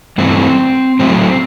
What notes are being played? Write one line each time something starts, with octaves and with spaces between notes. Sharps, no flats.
G2 E3 A3 C4
A2 F#3 A3 C4